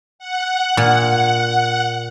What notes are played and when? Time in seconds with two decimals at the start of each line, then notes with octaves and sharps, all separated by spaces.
0.19 F#5
0.77 A#2